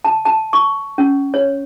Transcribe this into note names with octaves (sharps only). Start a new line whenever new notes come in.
A5
A5
C#6
C#4
C#5